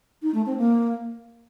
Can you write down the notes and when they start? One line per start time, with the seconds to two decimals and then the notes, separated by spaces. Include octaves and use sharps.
0.23 D#4
0.34 A3
0.46 C4
0.58 A#3